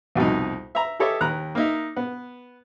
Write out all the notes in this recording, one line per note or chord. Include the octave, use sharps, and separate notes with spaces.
C2 F2 B2 D#4
E5 A#5
G4 A4 C#5 D#5 E5
D#2 A#5 F#6
A#3 D#4 E5
B3